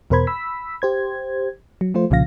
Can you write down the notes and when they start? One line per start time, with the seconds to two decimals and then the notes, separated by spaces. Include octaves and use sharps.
0.10 E2 B2 A#4 C5 B5 G#6
0.27 B5 E6 B6
0.82 G4 C5 G#6
1.81 F#3
1.94 F3 A3 F4 C5
2.11 C2 A#2 C#3 F3 F5 A#6